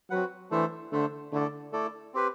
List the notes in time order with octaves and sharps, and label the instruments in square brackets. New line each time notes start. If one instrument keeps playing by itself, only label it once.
[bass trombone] F#3 [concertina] C4 F#4 B4 F#5
[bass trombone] E3 [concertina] A3 D4 A4 C5 E5
[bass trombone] D3 [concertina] A3 D4 A4 C5 E5
[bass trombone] D3 [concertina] A3 E4 A4 D5
[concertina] A3 E4 A4 D5
C4 G4 B4